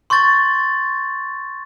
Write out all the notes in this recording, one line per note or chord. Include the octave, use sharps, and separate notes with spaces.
C6 C#6 G6 A6